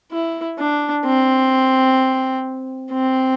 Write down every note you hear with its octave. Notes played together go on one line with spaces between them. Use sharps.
E4
D4
C4
C4